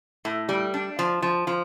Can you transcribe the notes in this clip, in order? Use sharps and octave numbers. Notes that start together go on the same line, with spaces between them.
A2
G3
D4
F3
F3
F3